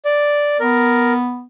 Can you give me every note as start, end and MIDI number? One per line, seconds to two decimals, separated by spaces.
0.05 0.58 74
0.60 1.44 59
0.60 1.13 70